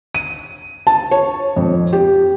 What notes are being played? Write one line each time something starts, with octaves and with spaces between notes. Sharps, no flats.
D#7
A5
C#5
F2
G4